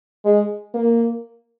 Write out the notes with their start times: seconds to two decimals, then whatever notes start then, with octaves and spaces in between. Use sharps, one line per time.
0.25 G#3
0.74 A#3